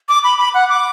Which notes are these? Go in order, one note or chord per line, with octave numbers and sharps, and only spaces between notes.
D6
B5
B5
F#5
D6